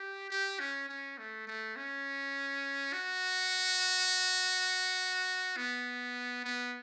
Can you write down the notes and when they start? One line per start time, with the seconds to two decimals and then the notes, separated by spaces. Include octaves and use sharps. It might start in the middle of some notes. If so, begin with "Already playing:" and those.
Already playing: G4
0.30 G4
0.60 C#4
0.89 C#4
1.18 A3
1.47 A3
1.76 C#4
2.93 F#4
5.57 B3
6.44 B3